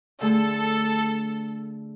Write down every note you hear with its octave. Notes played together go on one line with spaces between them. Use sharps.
D3 A3 G#4 A4